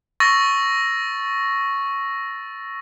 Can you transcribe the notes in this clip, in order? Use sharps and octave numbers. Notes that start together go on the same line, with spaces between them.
C#6 E6 A6 A#6